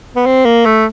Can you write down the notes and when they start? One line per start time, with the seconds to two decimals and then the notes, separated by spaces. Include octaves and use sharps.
0.15 B3
0.26 C4
0.45 A#3
0.65 A3